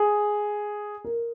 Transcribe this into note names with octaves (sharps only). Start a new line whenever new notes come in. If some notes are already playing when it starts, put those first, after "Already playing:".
Already playing: G#4
A#4